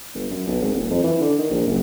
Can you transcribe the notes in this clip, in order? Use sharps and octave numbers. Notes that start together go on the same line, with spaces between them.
G1
F#2
B1
G#1
D#1
F2
E3
D3
D#3
A#1
F#1